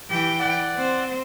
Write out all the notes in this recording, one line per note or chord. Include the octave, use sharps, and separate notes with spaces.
E3 G4 G5
D5 F#5
C4 C5